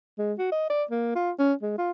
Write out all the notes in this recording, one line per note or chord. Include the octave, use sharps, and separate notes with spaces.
G#3
F#4
D#5
D5
A#3
F4
C#4
G#3
F4